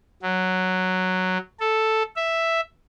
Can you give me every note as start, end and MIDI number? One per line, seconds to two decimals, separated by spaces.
0.22 1.38 54
1.60 2.03 69
2.16 2.61 76